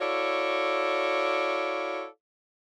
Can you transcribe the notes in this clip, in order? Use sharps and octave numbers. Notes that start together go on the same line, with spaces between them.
E4 F#4 A4 C#5 D5 F5